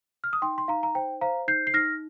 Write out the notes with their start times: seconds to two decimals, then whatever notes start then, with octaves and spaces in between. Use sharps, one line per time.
0.24 F6
0.33 D#6
0.42 D#4 G5 C6
0.58 C6
0.68 D#4 F5 A#5
0.83 A#5
0.95 C5 G5
1.21 C5 F5 A#5
1.48 D#4 G6 C7
1.67 C7
1.74 D#4 F6 A#6